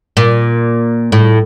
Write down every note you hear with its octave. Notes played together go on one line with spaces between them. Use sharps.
A#2
A2